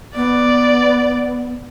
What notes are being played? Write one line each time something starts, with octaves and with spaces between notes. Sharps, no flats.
B3 D5